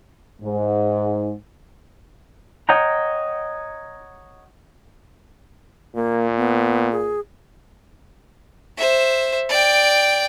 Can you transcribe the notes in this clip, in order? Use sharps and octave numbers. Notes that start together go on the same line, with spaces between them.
G#2
C#5 D#5 F#5 G5 A#5
A#2 A#3
B3
G#4
C5 E5
D5 G5